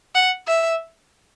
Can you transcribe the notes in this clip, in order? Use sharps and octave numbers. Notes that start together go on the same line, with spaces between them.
F#5
E5